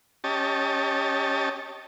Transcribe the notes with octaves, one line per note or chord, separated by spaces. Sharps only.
C#4 G4 D#5 A5